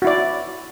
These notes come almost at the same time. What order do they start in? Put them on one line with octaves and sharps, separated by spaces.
F#4 E4 D5